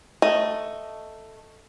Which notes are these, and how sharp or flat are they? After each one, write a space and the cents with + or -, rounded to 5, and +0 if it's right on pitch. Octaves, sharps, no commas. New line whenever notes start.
A3 +5 D#5 +0